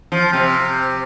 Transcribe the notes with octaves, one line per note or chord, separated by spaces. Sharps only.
F3
C3